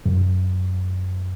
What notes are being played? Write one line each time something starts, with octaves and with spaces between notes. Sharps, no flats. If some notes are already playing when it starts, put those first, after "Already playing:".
F#2